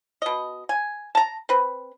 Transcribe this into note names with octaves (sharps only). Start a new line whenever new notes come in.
B2 D#5
G#5
A5 A#5
C4 B4